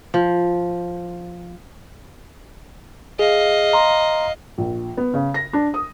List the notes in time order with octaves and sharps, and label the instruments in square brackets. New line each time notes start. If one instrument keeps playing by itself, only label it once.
[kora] F3
[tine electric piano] G#4 [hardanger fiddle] D#5 F5
[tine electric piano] A#5 C6
[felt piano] A#1
B3
C#3
A#6
D4
D#6